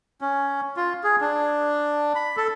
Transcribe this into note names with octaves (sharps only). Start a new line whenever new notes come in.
C#4
F4
G#4
D4
B5
A4